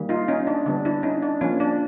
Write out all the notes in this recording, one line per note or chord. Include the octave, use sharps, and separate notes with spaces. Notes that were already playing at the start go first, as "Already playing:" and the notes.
Already playing: D#3 G3 A#3
D#4 F4
C#4 D#4
D4
D3 G3 B3 D4
D4 E4
C#4 D#4
D4
F3 A#3 C#4
D4